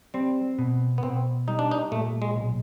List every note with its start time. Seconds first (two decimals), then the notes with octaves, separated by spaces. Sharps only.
0.14 G3 C4
0.58 B2
0.98 B3
1.03 B2 C4
1.48 G3 D#4
1.59 D4
1.71 D#4
1.92 A#2 A3
2.22 G#3
2.36 B1